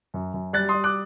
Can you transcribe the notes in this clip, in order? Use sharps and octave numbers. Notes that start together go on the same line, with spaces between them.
F#2
F#2
G3 F#6 A6
G3 C6 D#6
D6 F#6